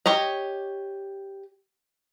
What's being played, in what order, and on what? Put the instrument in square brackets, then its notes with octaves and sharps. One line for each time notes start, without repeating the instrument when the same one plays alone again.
[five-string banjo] G4 C#5 D#5